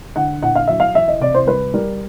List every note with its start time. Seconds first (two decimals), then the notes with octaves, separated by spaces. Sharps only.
0.16 D3 F#5
0.43 A#2 F#5
0.55 F5
0.68 F#3 E5
0.80 F5
0.95 E3 E5
1.08 D#5
1.21 C3 D5
1.34 C5
1.47 G3 B4
1.73 G3 A#4